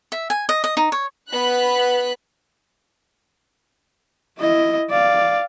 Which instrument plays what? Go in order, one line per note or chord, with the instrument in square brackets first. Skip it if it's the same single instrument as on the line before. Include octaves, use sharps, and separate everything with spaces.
[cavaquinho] E5
G#5
D#5
D#5
D#4
C#5
[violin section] B3 B5 F#6
[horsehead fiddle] E4 D#5
D5 F5